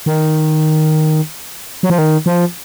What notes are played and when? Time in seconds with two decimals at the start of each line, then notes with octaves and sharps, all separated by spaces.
0.06 D#3
1.83 F#3
1.90 F3
1.98 D#3
2.26 F3